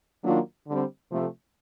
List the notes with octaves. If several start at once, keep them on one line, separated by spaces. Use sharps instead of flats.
D#3 F#3 A#3 D4 F4
D3 G3 C4
C3 F3 A3